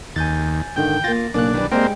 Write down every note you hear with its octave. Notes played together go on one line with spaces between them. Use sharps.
D#2 G#5 G6 A6
G#2 D3 D#3 G5
A#3 F4 A6 A#6
B1 C#3 A#3 D4 F#6
D#3 E3 G3
G#2 G3 G#3 A#3 C4 D4 G5